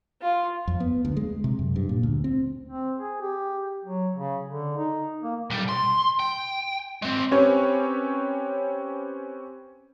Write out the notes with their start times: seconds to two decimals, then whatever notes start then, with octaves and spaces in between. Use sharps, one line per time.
0.21 F4
0.68 F2
0.80 B3
1.05 D2
1.17 G#3
1.44 C3
1.59 F#2
1.76 G2
1.89 A#2
2.03 D2
2.24 C4
2.68 C4
2.98 G#4
3.21 G4
3.85 F#3
4.15 C#3
4.48 D3
4.77 D#4
5.23 A#3
5.50 B1 G3
5.69 C6
6.19 G5
7.02 G#3 C4
7.31 C4 C#4 G4 B4 C#5